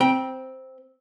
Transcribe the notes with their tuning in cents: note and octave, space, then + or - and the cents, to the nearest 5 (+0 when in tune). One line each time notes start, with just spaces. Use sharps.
C4 +0 G5 +0 B5 -40